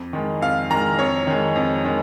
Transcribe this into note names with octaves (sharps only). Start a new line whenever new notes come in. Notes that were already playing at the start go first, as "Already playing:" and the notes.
Already playing: F2
D#3 G#3
F2 F5
D#3 G#3 A#5
F2 C#5
D#3 G#3
F2
D#3 G#3